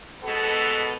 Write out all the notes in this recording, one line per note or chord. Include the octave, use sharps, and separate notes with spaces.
G#2 B2 B3 A4